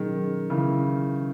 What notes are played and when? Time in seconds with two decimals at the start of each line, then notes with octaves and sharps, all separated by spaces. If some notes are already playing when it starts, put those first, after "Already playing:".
Already playing: B2 D#3 F#3 C#4 G#4
0.50 C#3 E3